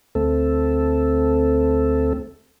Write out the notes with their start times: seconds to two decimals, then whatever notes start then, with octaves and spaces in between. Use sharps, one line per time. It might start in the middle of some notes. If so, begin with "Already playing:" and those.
0.15 D2 A3 C4 A4